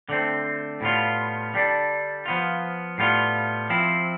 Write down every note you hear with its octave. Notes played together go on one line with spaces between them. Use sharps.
D3 A3 C4
A2 G3 B3 F4
D3 G3 D4
F3 B3 F4
A2 G3 B3 F4
F3 C4 E4